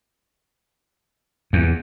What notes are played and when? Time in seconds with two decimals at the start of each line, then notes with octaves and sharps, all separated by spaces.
1.53 E2